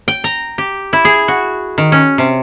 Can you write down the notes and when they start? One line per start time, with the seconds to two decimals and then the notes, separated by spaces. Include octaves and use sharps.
0.08 G5
0.24 A#5
0.58 G4
0.93 E4
1.05 G#4
1.28 F#4
1.78 D#3
1.92 C#4
2.18 C3